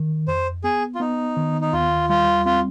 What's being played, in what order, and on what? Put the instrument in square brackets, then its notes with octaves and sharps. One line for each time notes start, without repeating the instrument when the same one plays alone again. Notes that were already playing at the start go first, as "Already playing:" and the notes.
Already playing: [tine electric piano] D#3
[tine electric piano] F2 [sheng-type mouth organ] C5
[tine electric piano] B3 [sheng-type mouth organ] G#4
[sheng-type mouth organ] F4
[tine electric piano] B3 [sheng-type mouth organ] D#4
[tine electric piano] D#3
[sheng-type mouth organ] D#4
[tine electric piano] D#2 [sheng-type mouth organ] F4
[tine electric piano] G3 [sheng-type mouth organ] F4
[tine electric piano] C4 [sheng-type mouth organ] F4